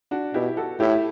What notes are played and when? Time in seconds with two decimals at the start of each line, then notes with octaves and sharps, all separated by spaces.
0.11 D4 F#4
0.34 B2 E4 G4
0.57 F#4 A4
0.80 A2 E4 G4